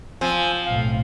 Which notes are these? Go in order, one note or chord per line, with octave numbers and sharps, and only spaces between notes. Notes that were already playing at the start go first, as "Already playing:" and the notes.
F3 C4 F4 G#5
B1 A2 F5